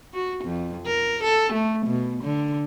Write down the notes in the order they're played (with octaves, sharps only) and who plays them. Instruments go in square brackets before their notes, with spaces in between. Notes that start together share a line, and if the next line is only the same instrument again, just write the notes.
[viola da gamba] F#4
F2
A#4
A4
A3
B2
D3